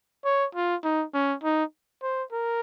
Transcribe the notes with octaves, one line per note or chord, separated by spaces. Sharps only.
C#5
F4
D#4
C#4
D#4
C5
A#4